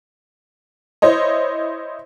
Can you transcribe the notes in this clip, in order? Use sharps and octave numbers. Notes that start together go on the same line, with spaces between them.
E4 C5 C#5 D#5